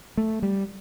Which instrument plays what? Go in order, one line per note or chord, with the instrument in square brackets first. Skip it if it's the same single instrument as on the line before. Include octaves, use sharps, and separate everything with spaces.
[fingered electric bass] A3
G3